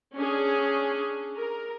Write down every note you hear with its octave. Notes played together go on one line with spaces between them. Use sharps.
C#4 D4 G#4
A#4